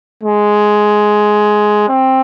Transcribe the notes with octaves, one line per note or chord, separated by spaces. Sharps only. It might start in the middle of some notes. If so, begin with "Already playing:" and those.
G#3
C4